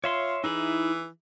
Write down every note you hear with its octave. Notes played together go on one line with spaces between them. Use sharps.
F4 C#5 E5 C6
E3 D#4 E4 G#4